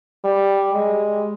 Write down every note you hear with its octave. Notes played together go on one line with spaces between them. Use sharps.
G3
G#3